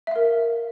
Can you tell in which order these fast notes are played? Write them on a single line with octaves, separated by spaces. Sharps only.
E5 F5 A#4